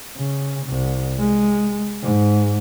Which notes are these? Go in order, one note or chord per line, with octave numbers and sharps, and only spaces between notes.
C#3
C2
G#3
G#2